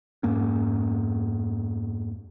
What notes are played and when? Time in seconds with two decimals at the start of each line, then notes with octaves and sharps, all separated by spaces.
0.23 F2 G#2 A#3 C#4